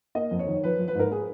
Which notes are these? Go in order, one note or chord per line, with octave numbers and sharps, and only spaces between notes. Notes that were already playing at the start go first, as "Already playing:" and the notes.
A#3 D#5
F2
C#5
D#3
F3 B4
F3
B4
G#2 A#4
G#4